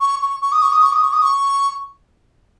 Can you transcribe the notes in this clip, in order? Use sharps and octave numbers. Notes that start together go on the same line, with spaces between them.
C#6
C#6
C#6
D#6
C#6
D#6
C#6
D#6
C#6
D#6
C#6